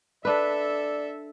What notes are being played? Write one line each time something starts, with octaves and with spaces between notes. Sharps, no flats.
D4 A4 B4 D5 E5